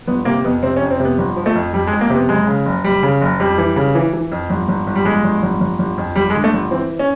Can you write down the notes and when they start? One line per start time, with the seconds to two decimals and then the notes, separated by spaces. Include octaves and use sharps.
0.07 G1 B3
0.25 C3 A#3
0.44 F2 B3
0.63 C3 C4
0.76 C#4
0.81 F2
0.90 C4
1.00 C3
1.05 B3
1.18 G1
1.36 F3
1.46 A3
1.55 F2
1.73 F2 G3
1.87 G#3
1.92 F2
2.01 A#3
2.10 C3
2.15 B3
2.29 F#1 G#3
2.47 C#3
2.66 F#1
2.84 F#1 G3
3.03 C#3
3.21 F#1
3.40 F2 G3
3.58 E3
3.76 C#3
3.95 E3
4.13 E3
4.32 F2
4.50 G1
4.68 G1
4.87 G1
4.95 G3
5.05 G1 G#3
5.24 G1
5.42 G1
5.60 G1
5.79 G1
5.98 F2
6.16 G1 G3
6.30 G#3
6.35 D3
6.44 A3
6.53 G1
6.71 E3 C4
6.99 C#4